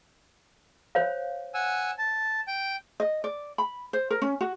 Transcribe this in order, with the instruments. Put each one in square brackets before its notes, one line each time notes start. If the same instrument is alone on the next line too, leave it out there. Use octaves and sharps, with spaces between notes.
[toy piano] C5 C#5 F5
[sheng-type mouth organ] F#5 G#5 E6
A5
G5
[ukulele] D#5
D5
B5
C5
A#4
C#4
F#4